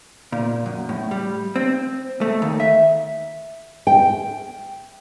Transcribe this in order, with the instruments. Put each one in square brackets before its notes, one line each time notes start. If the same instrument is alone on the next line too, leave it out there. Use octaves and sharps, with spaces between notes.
[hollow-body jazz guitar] A#2
F#2
A2
G3
C4
A3
D#2
E5
[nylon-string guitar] G5